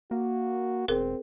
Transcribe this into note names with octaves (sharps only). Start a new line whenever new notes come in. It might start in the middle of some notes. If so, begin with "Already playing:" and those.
A#3 F#4
E1 C4 G#4 A#4